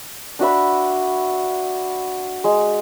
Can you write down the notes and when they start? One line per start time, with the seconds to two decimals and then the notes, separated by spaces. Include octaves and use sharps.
0.39 D4 F#4 E5 B5
2.44 G#3